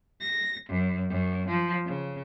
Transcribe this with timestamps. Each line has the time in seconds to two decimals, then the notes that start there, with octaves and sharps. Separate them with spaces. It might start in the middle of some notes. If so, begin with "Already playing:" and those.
0.20 A#6
0.69 F#2
1.10 F#2
1.48 F3
1.84 C#3